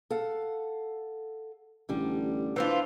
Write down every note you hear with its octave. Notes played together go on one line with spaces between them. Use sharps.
A4 F5 F#5
A1 D3 G3
E3 C4 D4 F4 F#5